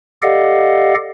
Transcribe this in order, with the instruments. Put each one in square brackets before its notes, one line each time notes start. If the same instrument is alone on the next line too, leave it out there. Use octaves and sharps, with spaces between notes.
[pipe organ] G4 A4 D5 D#5 F5 F#5